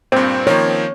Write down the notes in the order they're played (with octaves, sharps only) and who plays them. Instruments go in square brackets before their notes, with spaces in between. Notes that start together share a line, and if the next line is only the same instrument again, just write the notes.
[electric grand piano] G2 A#2 [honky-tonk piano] C4
[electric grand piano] D#3 F3 A#3 [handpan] C#5